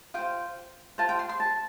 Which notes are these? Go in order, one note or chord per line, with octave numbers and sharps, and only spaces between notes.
F4 C5 G5
F4 C5 A5
G5
C6
C6
A5